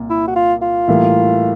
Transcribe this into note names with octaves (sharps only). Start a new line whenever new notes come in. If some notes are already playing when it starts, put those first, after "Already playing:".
Already playing: C2 A#2
E4
F#4
F4
F4
A2 E3 G3 A#3